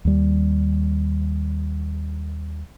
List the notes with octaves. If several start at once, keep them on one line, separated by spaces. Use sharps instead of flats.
D#2 G3